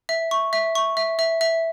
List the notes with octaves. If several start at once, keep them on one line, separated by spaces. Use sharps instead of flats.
E5
C#6
E5
C#6
E5
E5
E5